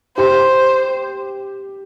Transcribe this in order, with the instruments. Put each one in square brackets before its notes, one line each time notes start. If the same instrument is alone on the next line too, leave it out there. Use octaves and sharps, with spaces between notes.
[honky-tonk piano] G4 [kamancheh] C5